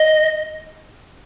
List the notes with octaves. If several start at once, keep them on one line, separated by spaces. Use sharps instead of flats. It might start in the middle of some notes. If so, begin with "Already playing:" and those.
Already playing: D#5